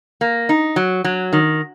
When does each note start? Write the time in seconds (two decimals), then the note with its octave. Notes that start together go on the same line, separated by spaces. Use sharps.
0.21 A#3
0.49 D#4
0.76 F#3
1.04 F#3
1.33 D#3